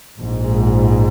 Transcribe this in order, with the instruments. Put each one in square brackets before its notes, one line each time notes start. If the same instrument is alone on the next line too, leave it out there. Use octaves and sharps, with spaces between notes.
[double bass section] A#1 G#2